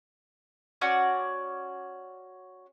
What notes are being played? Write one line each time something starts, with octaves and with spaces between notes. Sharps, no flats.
C#4 F#4 D5